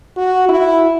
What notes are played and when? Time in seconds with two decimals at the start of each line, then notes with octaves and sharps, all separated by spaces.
0.17 F#4
0.49 E4